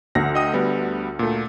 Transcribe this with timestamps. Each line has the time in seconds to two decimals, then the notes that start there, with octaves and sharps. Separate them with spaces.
0.15 D2 A#6
0.35 D#5 G5 D#6
0.54 G3 B3
1.19 A#2 A3